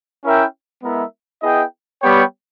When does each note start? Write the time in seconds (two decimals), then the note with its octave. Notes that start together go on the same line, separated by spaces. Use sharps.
0.25 C#4 E4 A#4 E5 G5
0.83 G#3 B3 E4 A#4 E5
1.42 B3 E4 G#4 D#5 G5
2.02 G3 B3 G4 C#5 G5